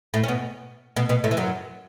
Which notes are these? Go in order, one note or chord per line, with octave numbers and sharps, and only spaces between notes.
A2 A3
C#4
B2 B3
B2 B3
B2 B3
A2 A3
E3
F#2 F#3